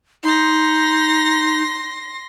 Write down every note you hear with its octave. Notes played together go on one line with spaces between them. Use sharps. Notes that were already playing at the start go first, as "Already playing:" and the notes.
D#4 C6 A#6